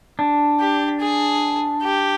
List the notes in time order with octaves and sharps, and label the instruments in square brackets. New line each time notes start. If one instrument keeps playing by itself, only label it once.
[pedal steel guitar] D4
[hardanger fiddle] G4
G#4
G4